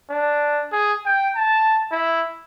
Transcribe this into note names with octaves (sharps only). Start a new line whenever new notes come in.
D4
G#4
G5
A5
E4